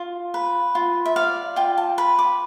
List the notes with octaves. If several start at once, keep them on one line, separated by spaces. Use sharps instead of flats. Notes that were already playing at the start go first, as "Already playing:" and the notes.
Already playing: F4
B4
F4
E5
D5 F5
F4 G5
A5
B4 B5
D6